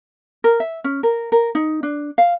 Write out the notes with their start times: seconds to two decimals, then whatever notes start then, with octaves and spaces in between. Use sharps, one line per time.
0.44 A#4
0.60 E5
0.84 C#4
1.03 A#4
1.32 A#4
1.55 D#4
1.83 D4
2.18 F5